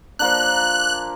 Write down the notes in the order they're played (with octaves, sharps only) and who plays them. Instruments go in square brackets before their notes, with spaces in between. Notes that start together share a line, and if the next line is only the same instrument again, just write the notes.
[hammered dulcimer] F3 A#3 D4 [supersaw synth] F#6